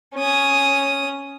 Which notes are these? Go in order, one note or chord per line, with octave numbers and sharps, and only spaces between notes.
C#4 D#6